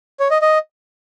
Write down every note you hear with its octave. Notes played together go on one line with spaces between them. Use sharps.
C#5
D#5
D#5